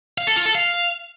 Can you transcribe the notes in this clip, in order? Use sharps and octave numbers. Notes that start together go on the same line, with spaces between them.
F5
A4
F4
A4
F5